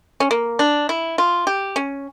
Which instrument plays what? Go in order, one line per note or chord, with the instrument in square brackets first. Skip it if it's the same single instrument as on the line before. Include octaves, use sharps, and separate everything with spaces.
[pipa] C#4
A#3
D4
E4
F4
G4
C#4